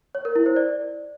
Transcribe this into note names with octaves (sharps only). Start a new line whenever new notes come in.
C#5
A#4
E4
C5
D5